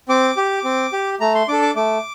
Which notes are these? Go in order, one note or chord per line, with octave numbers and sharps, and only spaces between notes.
C4 D6
G4
C4
G4
A3 A#5
C6
D4 A4 D6
D6
A3 D6